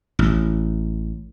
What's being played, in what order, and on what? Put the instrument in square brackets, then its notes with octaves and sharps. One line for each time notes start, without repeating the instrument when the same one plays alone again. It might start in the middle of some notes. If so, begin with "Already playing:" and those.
[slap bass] A1